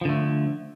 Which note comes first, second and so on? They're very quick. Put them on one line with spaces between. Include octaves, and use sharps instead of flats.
F3 D3 A3